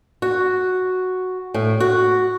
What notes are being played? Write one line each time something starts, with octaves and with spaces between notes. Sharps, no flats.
F#4
A2
F#4